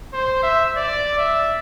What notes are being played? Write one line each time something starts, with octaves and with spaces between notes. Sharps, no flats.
C5
E5
D5
E5